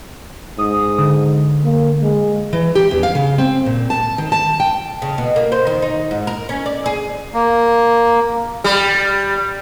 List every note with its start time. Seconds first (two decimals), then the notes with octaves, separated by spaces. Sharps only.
0.59 G#2 D#6
0.98 D3
1.64 A#3
2.02 G#3
2.53 E3
2.75 G4
2.91 E2
3.03 F5
3.15 C#3
3.38 C4
3.66 A#2
3.90 A5
4.18 D#3
4.32 A5
4.60 G5
5.02 C#3
5.18 B2
5.36 A#3
5.52 C5
5.67 D#3
5.82 D#4
6.11 G#2
6.27 A#4
6.49 C#4
6.66 D5
6.86 G#4
7.34 A#3
8.64 G3